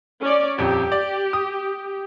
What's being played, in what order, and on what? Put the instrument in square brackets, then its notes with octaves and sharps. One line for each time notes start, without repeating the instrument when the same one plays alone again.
[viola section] C#4 D5
[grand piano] D#1 F2 [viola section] G4
[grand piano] D5
D#6